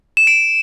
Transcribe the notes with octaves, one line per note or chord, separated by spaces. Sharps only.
E7
D7